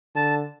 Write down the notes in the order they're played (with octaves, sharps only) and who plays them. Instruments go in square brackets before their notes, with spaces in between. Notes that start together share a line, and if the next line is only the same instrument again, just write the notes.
[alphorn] D3 [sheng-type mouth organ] A5